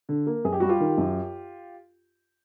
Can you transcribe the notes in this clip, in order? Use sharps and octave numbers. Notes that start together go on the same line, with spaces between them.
D3
A#3
F#2 G#4
G4
G3 F#4
F4 G4
D#3
F#2